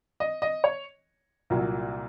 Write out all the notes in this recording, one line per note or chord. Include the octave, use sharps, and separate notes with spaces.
D#5
D#5
C#5
C2 A#2 F#3